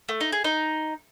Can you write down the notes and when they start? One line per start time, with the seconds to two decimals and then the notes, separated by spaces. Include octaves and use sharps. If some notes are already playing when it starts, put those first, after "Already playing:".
0.09 A3
0.21 D#4
0.32 G#4
0.44 D#4